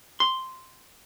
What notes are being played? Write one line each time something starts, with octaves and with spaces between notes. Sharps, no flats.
C6